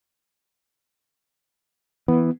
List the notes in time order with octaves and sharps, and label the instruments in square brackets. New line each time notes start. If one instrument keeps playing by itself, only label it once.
[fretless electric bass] E3 [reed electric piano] B3